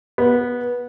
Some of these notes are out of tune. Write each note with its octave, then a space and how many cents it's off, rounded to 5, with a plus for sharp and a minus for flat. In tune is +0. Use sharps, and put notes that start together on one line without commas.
B3 -15